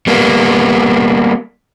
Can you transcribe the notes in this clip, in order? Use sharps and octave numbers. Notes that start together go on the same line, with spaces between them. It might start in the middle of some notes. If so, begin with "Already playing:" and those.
G3 A#3 B3